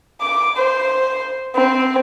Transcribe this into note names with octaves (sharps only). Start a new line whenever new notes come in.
D6
C5
C4